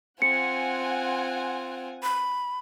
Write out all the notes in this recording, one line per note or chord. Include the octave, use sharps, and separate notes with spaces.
C4 F4 F#5 G#5 C#7
B5